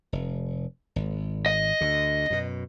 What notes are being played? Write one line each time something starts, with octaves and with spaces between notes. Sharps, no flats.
F1
G#1
D#5
D2 D3
F#2 B2